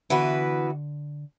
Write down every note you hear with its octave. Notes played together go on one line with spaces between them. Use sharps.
D3 E3 B3 F#4 B4